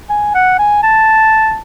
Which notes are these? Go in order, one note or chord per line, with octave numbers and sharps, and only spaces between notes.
G#5
F#5
G#5
A5